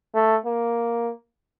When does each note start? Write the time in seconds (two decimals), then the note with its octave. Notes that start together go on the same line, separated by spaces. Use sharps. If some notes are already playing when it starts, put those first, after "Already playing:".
0.14 A3
0.45 A#3